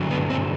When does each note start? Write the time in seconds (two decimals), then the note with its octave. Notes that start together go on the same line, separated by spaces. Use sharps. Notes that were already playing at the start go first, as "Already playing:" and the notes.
Already playing: G2 D3 F#3
0.11 B3
0.30 C4